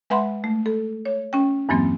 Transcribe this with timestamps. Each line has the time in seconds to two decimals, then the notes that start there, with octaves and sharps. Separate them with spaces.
0.10 G#3 B4 E5 F#5 B5 C6
0.44 A3
0.66 A4
1.05 C#5
1.33 C#4 G5
1.69 E2 G2 E3 F#3 A#3 C4